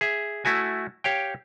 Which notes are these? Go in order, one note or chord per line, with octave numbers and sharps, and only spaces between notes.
G#4 E5
A3 E4 F#4 G#5
G4 C#5 F5 G5